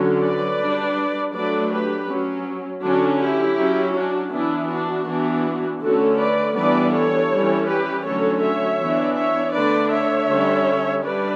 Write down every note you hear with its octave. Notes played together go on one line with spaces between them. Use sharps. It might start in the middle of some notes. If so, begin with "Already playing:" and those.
Already playing: D3 F#3 C#4
B4 D5
G3 D4
F#3 A3 D4 B4 D5
G4 B4
F#3 C#4
D3 F#3 C#4 D4 F#4
E4 G4
F#3 C#4
D4 F#4
E3 B3 D4 E4
D4 F#4
E3 B3 D4
D3 A3 C#4 F#4 A4
B4 D5
E3 G3 B3 D4 B4 D5
A4 C#5
E3 G3 C#4
G4 B4
D3 F#3 A3 C#4 A4 C#5
C#5 E5
E3 B3 D4
C#5 E5
D3 A3 D4 B4 D5
C#5 E5
D3 G3 C#4
G3 D4 B4 D5